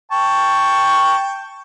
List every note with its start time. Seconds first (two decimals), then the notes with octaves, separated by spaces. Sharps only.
0.11 G5 A5 C#6